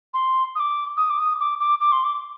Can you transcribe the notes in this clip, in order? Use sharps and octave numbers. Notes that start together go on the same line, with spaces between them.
C6
D#6
D6
D#6
D6
D#6
D6
D6
D6
C6
D6